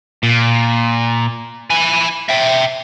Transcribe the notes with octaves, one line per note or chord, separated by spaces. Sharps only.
A#2
E4 G#5
E5 G5